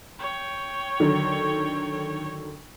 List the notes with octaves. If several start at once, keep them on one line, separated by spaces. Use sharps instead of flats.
C#5 G5
D3 D#3 F#3